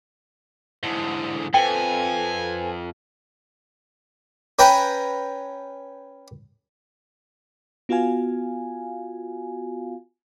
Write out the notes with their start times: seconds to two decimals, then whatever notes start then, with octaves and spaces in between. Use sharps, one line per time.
0.83 G#2 D3 E4 D#6
1.54 F2 A4 B4 C5 G5 G#5
4.59 C#4 B4 G5 A#5
7.89 B3 F4 F#4 F5 G#5